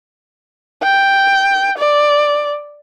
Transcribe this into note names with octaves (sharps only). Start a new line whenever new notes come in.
G5
D5